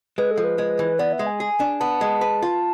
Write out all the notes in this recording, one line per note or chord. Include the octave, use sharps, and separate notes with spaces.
G#3 B4
A4
F3
B4
G#3
E3
B3 D5
E5
G#3
G#5
G#4
D4
B3 A5
G#3
B4
F4